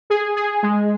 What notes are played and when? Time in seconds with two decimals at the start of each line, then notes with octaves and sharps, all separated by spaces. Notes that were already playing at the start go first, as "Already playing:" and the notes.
0.10 G#4
0.36 G#4
0.63 G#3